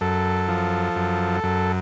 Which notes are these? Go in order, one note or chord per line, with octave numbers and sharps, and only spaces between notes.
F#2 A4
F3
F#2
F#2